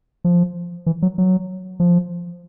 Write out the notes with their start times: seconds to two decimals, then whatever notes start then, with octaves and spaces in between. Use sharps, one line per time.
0.24 F3
0.86 E3
1.02 F#3
1.18 F#3
1.80 F3